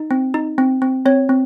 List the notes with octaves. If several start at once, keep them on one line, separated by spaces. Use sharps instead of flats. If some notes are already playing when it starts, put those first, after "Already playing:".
Already playing: D#4
C4
D#4
C4
C4
C4 C#5
C4